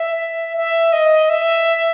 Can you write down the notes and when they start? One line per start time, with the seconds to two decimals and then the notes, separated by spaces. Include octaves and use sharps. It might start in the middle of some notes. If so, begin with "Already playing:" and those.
Already playing: E5
0.56 E5
0.92 D#5
1.29 E5